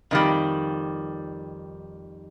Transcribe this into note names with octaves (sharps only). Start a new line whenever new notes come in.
F2 D#3 G3